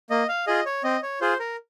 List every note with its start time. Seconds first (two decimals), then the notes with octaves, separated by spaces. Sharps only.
0.10 A#3 D#5
0.29 F5
0.47 F4 G#4 D#5
0.66 C#5
0.84 C4 D#5
1.02 C#5
1.21 F4 G#4 C5
1.40 A#4